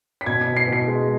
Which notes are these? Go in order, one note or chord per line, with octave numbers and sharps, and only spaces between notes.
B6
B2 G#6
B6
B2
C7
B2
C7
G#3